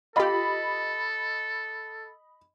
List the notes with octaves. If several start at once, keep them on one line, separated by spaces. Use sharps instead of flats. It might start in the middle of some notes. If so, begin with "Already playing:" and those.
F4 G4 A4 D#5 B5